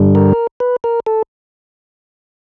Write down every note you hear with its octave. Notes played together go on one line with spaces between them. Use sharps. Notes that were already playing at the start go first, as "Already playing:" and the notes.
Already playing: G2 D3 G3
A#4
B4
A#4
A4